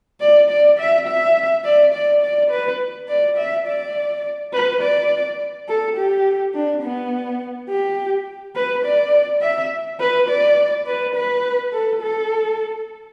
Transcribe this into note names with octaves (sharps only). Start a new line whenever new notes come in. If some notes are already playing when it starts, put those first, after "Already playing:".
D5
D5
E5
E5
D5
D5
D5
B4
D5
E5
D5
B4
D5
A4
G4
D4
B3
G4
B4
D5
E5
B4
D5
B4
B4
A4
A4